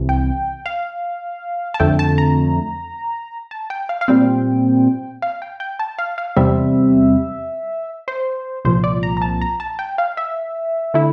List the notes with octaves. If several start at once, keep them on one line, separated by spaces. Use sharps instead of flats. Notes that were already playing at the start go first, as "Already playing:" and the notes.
Already playing: C2 C3 E3
G5
F5
A5
F2 D3 A3 G5
A5
A#5
A5
G5
F5
F5
A#2 G3 C4 G5
F5
G5
G5
A5
F5
F5
E2 C3 G3 C4 E5
C5
C2 A#2 F3 C5
D5
A#5
A#5
A5
A#5
A5
G5
F5
E5
D3 A3 E4